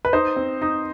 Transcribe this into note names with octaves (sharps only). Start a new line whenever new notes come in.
B4
D#4 C5
C4
D#4